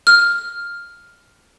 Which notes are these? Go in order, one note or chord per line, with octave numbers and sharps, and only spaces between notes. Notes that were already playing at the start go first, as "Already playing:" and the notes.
F6